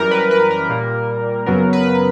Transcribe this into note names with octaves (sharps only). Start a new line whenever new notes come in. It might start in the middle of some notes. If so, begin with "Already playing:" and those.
Already playing: F#2 E3 G3 A#4
B4
B4
A#4
A#2 G3 A#3
F#2 C#3 F#3 B3 A#4
B4